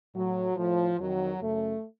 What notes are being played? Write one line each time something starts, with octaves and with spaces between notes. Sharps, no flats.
A2 F#3
A2 F3
F2 D#3 F#3
F#2 C#3 A3